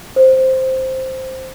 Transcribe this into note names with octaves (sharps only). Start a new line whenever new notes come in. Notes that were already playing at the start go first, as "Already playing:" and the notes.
C5